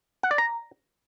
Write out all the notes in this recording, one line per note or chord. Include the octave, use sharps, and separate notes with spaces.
F#5
D5
A#5